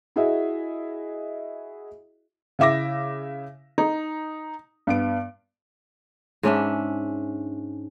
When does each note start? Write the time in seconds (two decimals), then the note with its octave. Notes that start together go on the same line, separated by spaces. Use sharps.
0.16 E4 F#4 G#4 D#5 E5
2.59 C#3 E4 E5 D6 A#6
3.78 D#4
4.87 G2 B3 D7
6.43 G#2 C#4 D4 E5